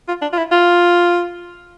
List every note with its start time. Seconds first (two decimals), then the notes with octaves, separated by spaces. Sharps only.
0.08 F4
0.22 D4
0.33 F4
0.38 E4
0.52 F4